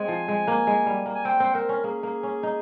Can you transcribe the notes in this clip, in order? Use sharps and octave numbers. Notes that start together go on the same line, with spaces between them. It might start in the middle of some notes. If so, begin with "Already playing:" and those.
Already playing: G#3 C4 G#5
F3
G#3
A#3
G#3
G3
A#3
G#5
C4 G5
C4
C4 A#4
C#4
A#3 G#4
A#3
C#4
D#4